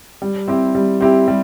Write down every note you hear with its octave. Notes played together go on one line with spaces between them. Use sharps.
G3
C4 E4 G4
G3
C4 E4 G4
G3